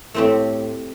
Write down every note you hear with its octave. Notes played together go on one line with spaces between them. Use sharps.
A2 A3 C4 G4